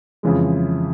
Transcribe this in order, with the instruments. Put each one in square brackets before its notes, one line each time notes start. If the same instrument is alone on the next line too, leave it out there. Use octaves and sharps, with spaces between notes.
[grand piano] F2 C#3 E3 G#3